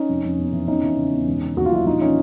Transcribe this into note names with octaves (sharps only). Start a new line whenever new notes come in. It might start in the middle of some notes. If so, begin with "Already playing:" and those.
Already playing: C#4 D#4
F1
F1
E2
E3
E2 C#4 D#4
E3
C#3
E2
E1
C#3
D#2 F#4
F4
F#3 E4 F#4
A#1 D#4 F4
E3 C#4 D#4